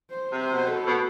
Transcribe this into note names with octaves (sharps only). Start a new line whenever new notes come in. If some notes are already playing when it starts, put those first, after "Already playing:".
C5
C3
C5
B2
A4
A2
B2